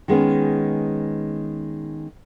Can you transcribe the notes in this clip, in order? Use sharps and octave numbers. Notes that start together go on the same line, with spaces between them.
D#3 G#3 B3 C#4